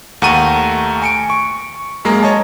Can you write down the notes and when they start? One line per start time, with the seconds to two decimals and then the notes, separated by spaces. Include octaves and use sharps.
0.22 D#2 A3 F#5 A#5 C#6 D#7
1.02 G#5 C#7 D7
1.30 C#6
2.05 F#2 G#3 A#3 A#5
2.23 C#5 D#5 A5